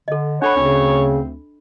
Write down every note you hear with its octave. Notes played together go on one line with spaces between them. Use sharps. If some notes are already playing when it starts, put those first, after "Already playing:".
D3 A4 D#5
D4 A4 C#5 F#5 B5
D2 C#3 C4 D4